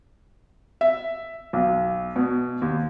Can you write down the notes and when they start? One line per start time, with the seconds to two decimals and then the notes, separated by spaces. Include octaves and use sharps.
0.81 E5
1.53 B1
2.16 B2
2.62 D#2